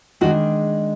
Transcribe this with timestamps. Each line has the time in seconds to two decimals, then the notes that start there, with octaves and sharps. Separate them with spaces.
0.21 D#3 G#3 D4 F#4